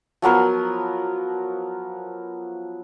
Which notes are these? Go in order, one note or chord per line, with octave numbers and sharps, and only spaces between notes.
F3 F#3 B3 A#4